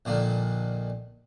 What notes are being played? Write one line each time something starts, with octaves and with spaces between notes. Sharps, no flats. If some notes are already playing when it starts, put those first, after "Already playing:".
A#1 A#2 D3 D#3